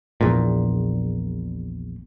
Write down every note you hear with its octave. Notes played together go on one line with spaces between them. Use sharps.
A#1 E2 A#2